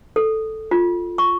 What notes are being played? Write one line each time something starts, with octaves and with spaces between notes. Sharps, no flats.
A4
F4
C#6